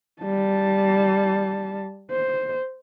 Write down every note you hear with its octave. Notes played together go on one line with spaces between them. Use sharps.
G3 A5
C5